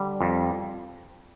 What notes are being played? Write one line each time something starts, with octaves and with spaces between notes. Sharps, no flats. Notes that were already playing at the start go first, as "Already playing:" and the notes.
Already playing: D3 G3
F2